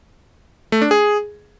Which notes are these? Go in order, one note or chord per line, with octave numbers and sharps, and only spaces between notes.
A3
D4
G#4